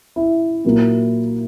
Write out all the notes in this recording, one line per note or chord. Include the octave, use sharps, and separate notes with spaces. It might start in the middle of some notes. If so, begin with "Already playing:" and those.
E4
A#2 F#3 A#3